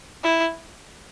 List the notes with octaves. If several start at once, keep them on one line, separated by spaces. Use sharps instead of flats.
E4